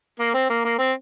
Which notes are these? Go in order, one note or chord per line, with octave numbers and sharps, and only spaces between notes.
A#3
C4
A#3
A#3
C4